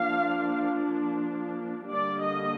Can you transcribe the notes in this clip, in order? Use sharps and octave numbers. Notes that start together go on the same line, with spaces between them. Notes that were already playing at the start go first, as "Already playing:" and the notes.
Already playing: F3 A#3 D4 F5
D3 G3 A#3 D4 D5
D#5